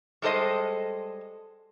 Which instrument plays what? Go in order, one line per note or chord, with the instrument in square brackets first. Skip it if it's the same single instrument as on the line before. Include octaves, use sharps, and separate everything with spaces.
[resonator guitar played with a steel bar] G3 G#3 A4 C5 D#5